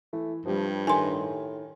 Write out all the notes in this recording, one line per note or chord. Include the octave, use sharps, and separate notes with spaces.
E3 A3
G2 C3 F3 G3
A2 D#3 G#5 C6